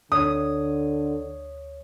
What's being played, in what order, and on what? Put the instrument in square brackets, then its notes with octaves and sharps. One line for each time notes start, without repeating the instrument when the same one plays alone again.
[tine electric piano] D2 C#5 G#6 [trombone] D3 [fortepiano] D#6